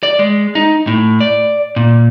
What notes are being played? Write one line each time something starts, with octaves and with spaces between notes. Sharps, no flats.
D5
G#3
D#4
A2
D5
A#2